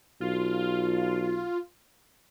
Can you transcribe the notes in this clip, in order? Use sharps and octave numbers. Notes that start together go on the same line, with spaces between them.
B1 F4